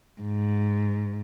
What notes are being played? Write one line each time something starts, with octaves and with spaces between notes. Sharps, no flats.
G#2